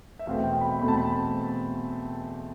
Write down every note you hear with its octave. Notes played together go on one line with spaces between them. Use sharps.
E5
E2 B2 A3 C4 F5
G5
B5
E2 B2 A3 C4 B5
A5
B5